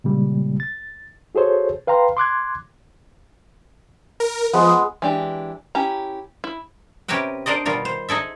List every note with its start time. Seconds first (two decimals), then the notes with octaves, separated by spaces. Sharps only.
0.04 A#2 C#3 G3 G#3 A#3
0.60 A6
1.35 F#4 G#4 A4 C5 C#5
1.87 B4 F5 G5 A#5 C6
2.17 C6 D6 F#6 G#6
4.20 A#4
4.53 F3 G#3 B3
5.02 E3 G#3 D4 G4
5.75 C#4 E4 G4 A#5
6.44 E4
7.08 C3 C#4 G4 A#4 B4 G5
7.46 D4 A#4 C5 D5 D#5
7.65 B2 D#3 G3 F4 A#4
7.85 C5
8.09 D#4 G#4 A4 E5